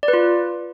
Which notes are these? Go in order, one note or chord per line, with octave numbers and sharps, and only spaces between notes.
D5
B4
F4